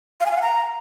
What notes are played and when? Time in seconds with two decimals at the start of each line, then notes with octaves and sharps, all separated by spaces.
0.20 F5
0.26 G#5
0.31 F5
0.37 F#5
0.42 A#5